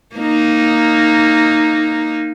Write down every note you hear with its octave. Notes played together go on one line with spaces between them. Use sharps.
A#3 D#4